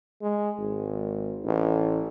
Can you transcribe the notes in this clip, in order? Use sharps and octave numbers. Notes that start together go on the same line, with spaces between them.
G#3
G#1
A1